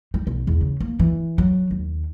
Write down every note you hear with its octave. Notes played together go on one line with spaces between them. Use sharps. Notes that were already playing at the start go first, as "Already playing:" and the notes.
G3
B1
E2
C#3
A#3
E3
F#3
D#2